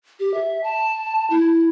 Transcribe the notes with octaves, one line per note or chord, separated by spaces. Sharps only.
G4
E5
A5
E4